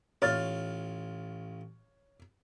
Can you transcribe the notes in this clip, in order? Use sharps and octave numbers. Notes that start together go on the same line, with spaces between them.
A1 F4 C#5 F6 A6